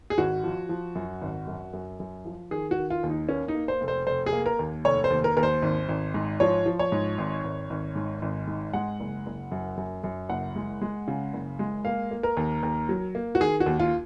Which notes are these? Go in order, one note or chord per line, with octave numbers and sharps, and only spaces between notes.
G#4
G#1 F#4
F3
F3
F#2
G#1
F#2
F#2
F#2
F3
D#3 G#4
F#4
D#3
F4
D#2
D#4
A#3 C#4
D#4
A#3
C5
F1
C5
F1 C5
G#4
A#3
A#4
D#2
F1 C#5
C5
D#2
A#4
D#2 A#4
C5
G#1
G#1
G#2
F3 C#5
F3
C#5
G#2
G#1
G#1
G#1
G#2
G#1
G#2
G#3 F#5
F#1
F#1
F#2
F#2
F#2
F#1 F#5
G#3
G#3
C#3
F#1
G#3
A#3 F5
A#3
A#4
D#2
D#2
F#3
A#3
F#4
D#3 G#4
F#4
D#2
F4